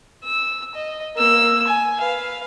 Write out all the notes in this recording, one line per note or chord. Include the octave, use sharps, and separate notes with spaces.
E6
D#5
A#3 E6
G#5
B4 F5